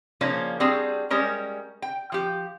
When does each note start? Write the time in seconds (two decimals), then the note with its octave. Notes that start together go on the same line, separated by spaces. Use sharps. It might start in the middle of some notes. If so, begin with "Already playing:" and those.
0.21 C#3 F3 A#3 C#4 D4
0.60 G3 C4 D4 F#4 G#4
1.10 G3 G#3 C#4 A#4
1.82 G5
2.12 F3 G4